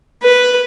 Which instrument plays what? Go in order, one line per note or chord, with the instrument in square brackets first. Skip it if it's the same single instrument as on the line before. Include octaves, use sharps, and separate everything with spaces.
[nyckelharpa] B4